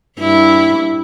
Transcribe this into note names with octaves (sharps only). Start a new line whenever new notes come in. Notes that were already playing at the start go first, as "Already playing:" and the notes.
G2 E4